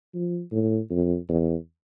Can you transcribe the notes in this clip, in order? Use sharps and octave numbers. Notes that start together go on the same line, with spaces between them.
F3
A2
F2
E2